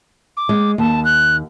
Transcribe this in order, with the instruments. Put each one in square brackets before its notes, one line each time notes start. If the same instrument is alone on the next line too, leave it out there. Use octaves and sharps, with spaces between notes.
[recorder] D6
[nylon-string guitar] G#3
[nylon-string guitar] D#2 [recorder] A5
[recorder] F#6